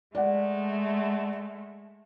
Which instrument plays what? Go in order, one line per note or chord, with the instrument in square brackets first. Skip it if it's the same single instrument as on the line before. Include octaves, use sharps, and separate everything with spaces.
[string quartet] G#3 A3 [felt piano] D5 F#5